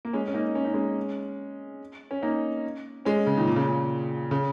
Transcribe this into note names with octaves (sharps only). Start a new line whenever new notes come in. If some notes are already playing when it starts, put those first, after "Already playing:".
A#3
G#3 C#4
C#4
A#3 D#4
C#4
D#4
G#3 C#4
C#4
A#3 D#4
G#3 C#4
C#3
A#2 D#3
A#2
C#3
A#2
C#3